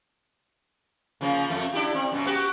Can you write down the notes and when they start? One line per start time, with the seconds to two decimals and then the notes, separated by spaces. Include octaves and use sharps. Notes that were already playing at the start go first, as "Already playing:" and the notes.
1.21 C#3 F3 A#3
1.50 F2 A3
1.73 D4 E4 G4
1.95 C4
2.12 F#2 B2
2.26 B3 F#4 G4